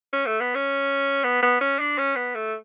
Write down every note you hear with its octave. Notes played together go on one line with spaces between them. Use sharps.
C#4
A3
B3
C#4
B3
B3
C#4
D4
C#4
B3
A3